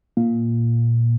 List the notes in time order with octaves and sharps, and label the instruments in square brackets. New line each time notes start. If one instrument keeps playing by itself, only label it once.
[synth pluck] A#2